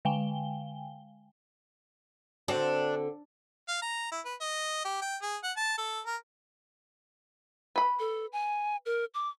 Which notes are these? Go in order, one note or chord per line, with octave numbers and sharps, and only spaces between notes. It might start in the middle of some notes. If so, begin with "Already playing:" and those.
D3 G#3 F5 G5 G#5 G7
D3 C4 D4 F#4
F5
A#5
E4
B4
D#5
G4
G5
G#4
F#5
A5
A4
A#4
B4 B5
A4
G#5
A#4
D6